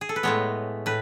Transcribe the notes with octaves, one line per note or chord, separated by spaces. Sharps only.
G#4
A4
B4
A2 G#3 B3 C#5
A2 B4